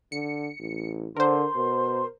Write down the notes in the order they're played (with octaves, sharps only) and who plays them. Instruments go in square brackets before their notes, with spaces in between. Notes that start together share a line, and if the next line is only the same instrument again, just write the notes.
[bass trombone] D3 [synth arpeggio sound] C#7
[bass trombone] A1
[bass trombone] D3 [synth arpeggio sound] A#4 C5 [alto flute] C6
[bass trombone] B2